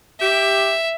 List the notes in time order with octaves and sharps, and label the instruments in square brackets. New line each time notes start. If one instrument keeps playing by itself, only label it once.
[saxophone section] G4 [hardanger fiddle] E5